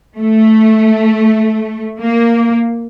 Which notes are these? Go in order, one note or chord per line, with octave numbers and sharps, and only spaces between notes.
A3
A#3